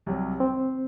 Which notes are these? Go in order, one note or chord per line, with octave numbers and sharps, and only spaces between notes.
C2 C3 F#3
C4